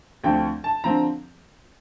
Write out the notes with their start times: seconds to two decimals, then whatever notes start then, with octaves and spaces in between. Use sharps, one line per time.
0.24 D2 D3 F3 C4 G5
0.64 A5
0.84 D3 F3 C4 A#5